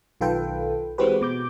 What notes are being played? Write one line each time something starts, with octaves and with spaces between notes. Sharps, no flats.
B1 D#3 F4 A4 B4 G5
E3 G#3 C4 F#4 G4 B4
B2 D6 G6